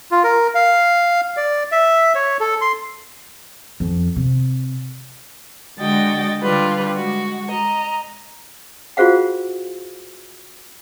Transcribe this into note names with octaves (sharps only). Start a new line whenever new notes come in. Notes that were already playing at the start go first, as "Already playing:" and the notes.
F4
A#4
F5
D5
E5
C#5
A4
C6
F2
C3
D3 G#3 F#4 D#5 G5 A6
D3 G3 F4 B4
G#3 F#4
D#5 A#5
F4 F#4 G#4 C5 F5 F#5